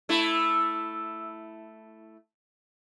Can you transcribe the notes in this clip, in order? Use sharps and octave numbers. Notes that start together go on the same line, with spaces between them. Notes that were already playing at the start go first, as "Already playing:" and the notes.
A3 E4